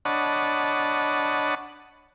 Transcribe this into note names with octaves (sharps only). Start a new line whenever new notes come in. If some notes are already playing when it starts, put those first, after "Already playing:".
D4 C#5 D#5 F#5 A5 B5